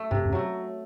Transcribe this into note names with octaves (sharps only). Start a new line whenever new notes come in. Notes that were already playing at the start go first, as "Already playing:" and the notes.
Already playing: A3
G2 C3
F#2
F#3 A3